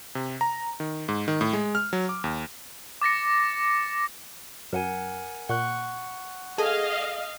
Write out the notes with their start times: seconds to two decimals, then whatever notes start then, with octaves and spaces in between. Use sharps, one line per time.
0.15 C3
0.41 A#5
0.80 D#3
1.08 G#2
1.28 D#3
1.41 A2
1.53 G#3
1.75 F6
1.93 F#3
2.09 D6
2.24 D#2
3.01 D6 A6 A#6 C#7
4.73 F#2 A#4 F#5 G#5
5.49 A#2 F#5 C#6 F#6
6.58 G#4 A4 D#5 F5 G#5